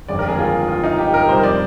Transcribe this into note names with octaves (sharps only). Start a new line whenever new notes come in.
G1 F2 D#3 G#3 D5
A#4
G#4
F4
F4
D#4
G4
A#4
F2 C3 G3 C5
D5